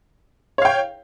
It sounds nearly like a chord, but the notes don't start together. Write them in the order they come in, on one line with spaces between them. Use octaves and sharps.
C#5 F5 G5